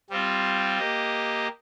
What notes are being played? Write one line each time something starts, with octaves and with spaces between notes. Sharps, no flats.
G3 C4 F4
A#3 G4 D#5